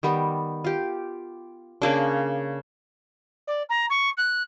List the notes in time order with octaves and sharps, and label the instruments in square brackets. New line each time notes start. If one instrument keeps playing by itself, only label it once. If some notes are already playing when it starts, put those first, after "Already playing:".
[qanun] D#3 G3 B3
F4 G4
C#3 A#3 D4
[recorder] D5
A#5
C#6
F#6